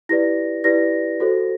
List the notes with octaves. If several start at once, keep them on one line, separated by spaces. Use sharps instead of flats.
E4 G4 B4 D5 A#6
E4 G4 B4 D5 A#6
F#4 A4 C5